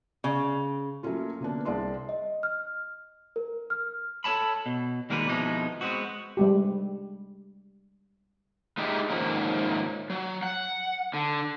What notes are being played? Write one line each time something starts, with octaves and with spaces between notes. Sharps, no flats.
C#3
F#3 A3 A#3 C#4 F4
D3 A#3 B3 C#4 D4
C2 G#4 D5 A5 C6
D#5
F6
A#4
F6
A4 A#4 C#5 A5 B5
B2
D#3 G3 G#3 A#3 F#4 B4
F2 B2 E3 F3 G#3 D#4
G#3 B3 C4 F#4
G3 G#3 G4
G#3 D#4 E4 G4
G#2 D#3 F3 A#3 C#4
F#3
F#5
D3